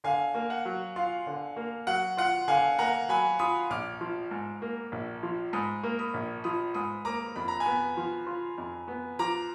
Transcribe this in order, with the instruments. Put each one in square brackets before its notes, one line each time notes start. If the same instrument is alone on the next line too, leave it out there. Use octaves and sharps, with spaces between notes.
[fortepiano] D3 [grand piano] F5 G#5
[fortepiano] A#3
[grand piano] F#5
[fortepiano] F#3
[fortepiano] F4 [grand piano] F5
[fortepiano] D3
A#3
[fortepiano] F#3 [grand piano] F#5
[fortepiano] F4 [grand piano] F#5
[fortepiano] D3 [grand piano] F5 G#5
[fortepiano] A#3 [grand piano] F#5 A#5
[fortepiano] F#3 [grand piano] G#5 B5
[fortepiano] F4 [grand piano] B5 D#6
[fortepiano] A#1 [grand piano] D6 F6
[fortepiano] F3
G#2
A#3
A#1
F3
[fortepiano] G#2 [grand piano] B5 D#6
[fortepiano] A#3
[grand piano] B5 D#6
[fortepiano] A#1
[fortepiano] F3 [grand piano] B5 D#6
[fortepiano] G#2 [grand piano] B5 D#6
[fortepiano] A#3 [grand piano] A#5 D6
[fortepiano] F2 [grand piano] B5
[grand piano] A#5
G#5 B5
[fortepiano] B3
F3
F4
F2
B3
[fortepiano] F3 [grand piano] A#5 D6